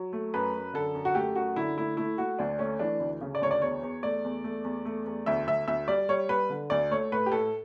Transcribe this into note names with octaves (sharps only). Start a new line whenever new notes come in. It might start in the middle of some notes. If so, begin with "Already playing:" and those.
Already playing: F#3
A3
F#2 B4
F#2
D3 A4
F#2
F#4
A3 G4
F#2 F#4
D3 E4
A3 E4
A3 E4
A3 F#4
D2 D4
A3 C#4
E3 D4
D2
C#3
D5
D2 C#5
D5
E2 C#5
E2
A3 D5
E2
A3
E2
A3
E2
D2 E5
D2 E5
D2 E5
G3 D5
G3 C#5
G3 B4
D3
D2 D5
A3 C#5
A2 B4
G4
A2 A4